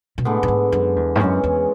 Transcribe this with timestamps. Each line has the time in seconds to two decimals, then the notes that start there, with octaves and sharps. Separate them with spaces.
0.18 B2
0.25 A2 D3 G#3 B3
0.43 A2
0.48 G#2
0.72 F#2
0.96 E2
1.15 G#2
1.20 F#2 C#3 E3 G#3 C#4
1.44 E2